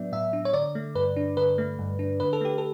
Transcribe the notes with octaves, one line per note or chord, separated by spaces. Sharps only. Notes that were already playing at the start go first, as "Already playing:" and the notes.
Already playing: A2 F#3 B3 D4 D5 E5
A2 E5
D4
C#5
D3 D5
A3
G2 B4
D4
D3 B4
A3
G2
D4
D3 B4
A4
A3 G4
A4